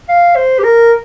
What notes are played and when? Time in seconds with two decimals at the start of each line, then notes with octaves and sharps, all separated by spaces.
0.09 F5
0.36 C5
0.59 G4
0.63 A#4